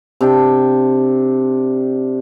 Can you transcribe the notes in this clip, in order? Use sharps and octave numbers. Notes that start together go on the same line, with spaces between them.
C3 D4 G5